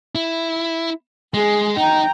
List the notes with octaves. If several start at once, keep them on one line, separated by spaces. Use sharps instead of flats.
E4
G#3 G#4
D#4 G5 A#5